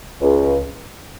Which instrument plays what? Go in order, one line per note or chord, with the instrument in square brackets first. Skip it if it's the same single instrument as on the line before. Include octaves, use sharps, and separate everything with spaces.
[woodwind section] C#2